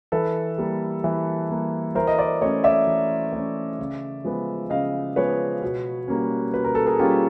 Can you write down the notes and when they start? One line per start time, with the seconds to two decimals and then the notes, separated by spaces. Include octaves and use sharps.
0.12 E3 A4 B4
0.58 G3 A#3
1.04 E3
1.50 G3 A#3
1.95 E3 A#4 C5
2.07 D#5
2.18 C5 D5
2.41 A3 C#4 C#5 D#5
2.64 D5 E5
2.87 E3
3.33 A3 C#4
3.79 C#3
4.25 F3 G#3 B3
4.70 C#3 D#5 F5
5.16 F3 G#3 B3 B4 C#5
5.62 B2
6.08 G3 A#3 C#4
6.54 B2 B4
6.65 A#4
6.75 A4
6.87 G#4 A#4
6.99 G3 A#3 C#4 F4 G4